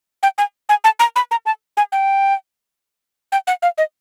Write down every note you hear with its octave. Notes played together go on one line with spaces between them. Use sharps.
G5
G#5
G#5
A5
A#5
B5
A#5
A5
G#5
G5
G5
F#5
F5
D#5